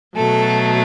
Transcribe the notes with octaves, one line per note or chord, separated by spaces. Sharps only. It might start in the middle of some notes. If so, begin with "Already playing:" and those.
B2 F#3 A3 A4